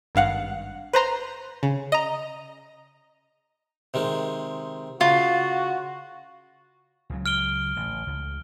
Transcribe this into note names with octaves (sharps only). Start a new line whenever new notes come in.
G#1 G2 F5 F#5
B4 C5 A#5 C6
C#3
D#5 A#5
C3 D#3 G#3
C#3 F4 F#4
C#2 C#3 F#3
F6 D7 G7
A1
C#2